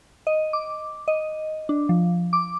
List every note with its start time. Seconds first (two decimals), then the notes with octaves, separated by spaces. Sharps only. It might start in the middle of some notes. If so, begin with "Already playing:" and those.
0.27 D#5
0.53 D6
1.08 D#5
1.69 D4
1.89 F3
2.33 D6